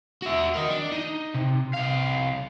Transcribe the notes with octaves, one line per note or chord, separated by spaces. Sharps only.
F#4 E5
A#4 D#5
D4
D#4
C3
C2 F5